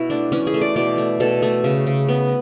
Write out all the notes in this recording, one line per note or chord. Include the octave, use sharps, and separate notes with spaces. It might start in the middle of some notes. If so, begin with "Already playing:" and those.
Already playing: B2 E4 F#4
A3 D4
E3 C#4
G#4
A3
D5
B2 D5
A3
B2 A4
A3
C#3
C#3
B3